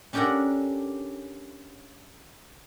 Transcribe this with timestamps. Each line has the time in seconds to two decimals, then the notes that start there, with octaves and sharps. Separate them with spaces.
0.13 C#4 D4 G4 A4 A#4 F#5